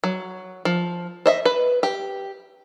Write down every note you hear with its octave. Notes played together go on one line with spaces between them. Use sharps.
F#3
F3
C5 D#5 E5
B4
G4